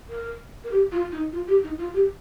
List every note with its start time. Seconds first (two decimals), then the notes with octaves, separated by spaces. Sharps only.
0.10 A#4
0.64 A#4
0.71 G4
0.92 F4
1.12 D#4
1.32 F4
1.48 G4
1.63 D#4
1.78 F4
1.94 G4